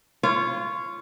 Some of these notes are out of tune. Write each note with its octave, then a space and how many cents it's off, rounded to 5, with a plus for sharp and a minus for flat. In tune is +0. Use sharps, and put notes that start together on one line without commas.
F4 -20 C#5 +0